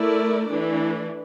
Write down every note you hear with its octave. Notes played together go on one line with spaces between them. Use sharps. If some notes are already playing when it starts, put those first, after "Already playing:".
Already playing: A3 E4 A#4 D5
E3 A3 D4